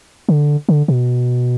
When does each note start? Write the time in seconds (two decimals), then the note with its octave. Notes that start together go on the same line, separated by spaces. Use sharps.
0.29 D3
0.69 D3
0.88 B2